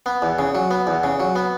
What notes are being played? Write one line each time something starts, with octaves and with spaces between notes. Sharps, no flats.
B3
E2
C#3
F#3
B3
E2
C#3
F#3
B3